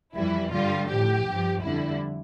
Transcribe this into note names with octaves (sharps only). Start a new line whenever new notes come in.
F2 E3 G3 E4
G2 D3 G3 F4
A2 F3 G4
G2 F3
F2 D3 G3 E4